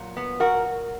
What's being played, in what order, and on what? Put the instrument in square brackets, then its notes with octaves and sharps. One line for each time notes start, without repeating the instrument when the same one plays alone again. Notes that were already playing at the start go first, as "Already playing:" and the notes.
Already playing: [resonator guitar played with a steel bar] A#2 F#3
B3
F#4 A#4